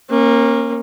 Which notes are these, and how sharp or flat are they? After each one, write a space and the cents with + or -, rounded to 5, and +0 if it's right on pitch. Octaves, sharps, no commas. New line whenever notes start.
A#3 +0 C#4 -35